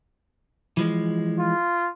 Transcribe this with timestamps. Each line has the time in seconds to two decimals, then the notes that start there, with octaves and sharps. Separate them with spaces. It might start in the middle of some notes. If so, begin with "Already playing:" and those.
0.77 E3 F3 G#3
1.39 F4